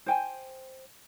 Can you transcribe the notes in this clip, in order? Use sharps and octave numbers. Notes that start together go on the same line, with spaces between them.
C5 G5 G#5